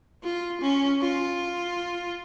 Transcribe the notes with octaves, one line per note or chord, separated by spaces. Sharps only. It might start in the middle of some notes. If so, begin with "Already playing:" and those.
F4
C#4
F4